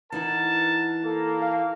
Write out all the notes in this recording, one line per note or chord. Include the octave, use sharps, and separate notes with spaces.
E3 D#4 E4 A#4 F#5 A5
A#3 A4
F5